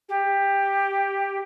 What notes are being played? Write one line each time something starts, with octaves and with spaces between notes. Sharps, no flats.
G4